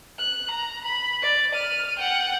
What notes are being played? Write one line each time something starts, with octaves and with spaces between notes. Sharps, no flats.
F#6
A#5
B5
D5
F6 D#7
F#5 G5